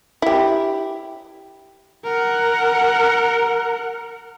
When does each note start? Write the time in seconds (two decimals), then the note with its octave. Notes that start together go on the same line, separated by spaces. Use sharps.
0.22 E4 G4
2.04 A#4 F#5